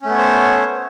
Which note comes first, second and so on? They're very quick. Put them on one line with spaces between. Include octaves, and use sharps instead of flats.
C#4 A3 B3 C#5 C5